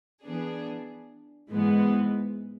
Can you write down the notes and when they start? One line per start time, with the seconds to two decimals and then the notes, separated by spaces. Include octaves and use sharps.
0.23 E3 B3 D4 G#4
1.51 G#2 E3 G#3 B3